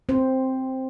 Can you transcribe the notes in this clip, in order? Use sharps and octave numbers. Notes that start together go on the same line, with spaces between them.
C4 C5